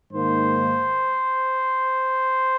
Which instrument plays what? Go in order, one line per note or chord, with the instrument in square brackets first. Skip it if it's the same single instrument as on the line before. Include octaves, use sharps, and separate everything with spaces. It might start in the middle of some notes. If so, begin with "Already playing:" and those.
[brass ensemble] G#2 D#3 A#3 C5